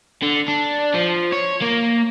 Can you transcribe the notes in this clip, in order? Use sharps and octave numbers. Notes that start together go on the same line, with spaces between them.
D3
D4
F3
C#5
A#3